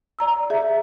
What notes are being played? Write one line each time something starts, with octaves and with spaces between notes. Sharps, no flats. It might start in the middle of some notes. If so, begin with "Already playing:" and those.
D5 A#5 E6
G#4 E5